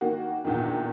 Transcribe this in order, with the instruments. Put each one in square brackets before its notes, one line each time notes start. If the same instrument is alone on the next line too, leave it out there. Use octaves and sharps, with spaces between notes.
[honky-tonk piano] D#3 A#3 F#4
E2 A#2 D3 D#3